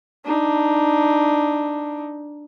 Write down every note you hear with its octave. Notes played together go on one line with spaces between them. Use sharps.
D4 D#4